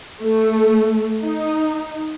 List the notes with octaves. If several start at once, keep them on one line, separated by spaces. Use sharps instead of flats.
A3
D#4